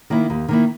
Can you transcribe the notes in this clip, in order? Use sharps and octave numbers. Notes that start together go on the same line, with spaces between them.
D#3 A#3 E4
D#2
D#3 A#3 E4